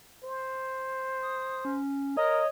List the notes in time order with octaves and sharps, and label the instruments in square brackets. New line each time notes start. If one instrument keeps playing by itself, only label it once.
[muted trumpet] C5
[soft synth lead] D#6
C#4
[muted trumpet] A#4 [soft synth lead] C#5 [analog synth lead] D#5